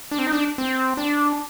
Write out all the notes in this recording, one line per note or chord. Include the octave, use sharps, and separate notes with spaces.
D4
C4
D#4
D4
C4
D4